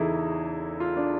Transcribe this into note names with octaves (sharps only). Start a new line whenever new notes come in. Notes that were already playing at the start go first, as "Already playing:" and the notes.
Already playing: E2 C#3 E3 D#4 E4 G#4 A4
F4
D4